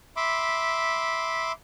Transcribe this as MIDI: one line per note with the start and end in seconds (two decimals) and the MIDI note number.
0.16 1.52 76
0.16 1.52 83
0.16 1.52 84
0.16 1.52 86